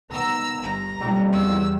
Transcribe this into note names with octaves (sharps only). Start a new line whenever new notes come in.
D#3 B3 A#5 E6
G1 A#5
F#1 B1 F2 G3
E2 E6